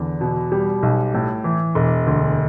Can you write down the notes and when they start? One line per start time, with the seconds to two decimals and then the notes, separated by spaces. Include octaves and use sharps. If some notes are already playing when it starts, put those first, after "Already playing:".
Already playing: E2 D3
0.21 B2
0.52 G3
0.83 B1
1.14 A2
1.44 E3
1.75 E1
2.07 D2